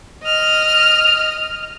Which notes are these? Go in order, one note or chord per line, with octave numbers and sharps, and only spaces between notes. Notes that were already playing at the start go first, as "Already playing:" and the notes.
D#5 F6